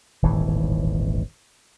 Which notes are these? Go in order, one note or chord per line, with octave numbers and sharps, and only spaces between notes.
D#1 G#1 A2 E3